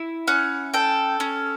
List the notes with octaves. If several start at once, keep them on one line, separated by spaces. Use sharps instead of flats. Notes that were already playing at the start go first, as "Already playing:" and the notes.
Already playing: E4
C#4 F#5
A4 G5
C#4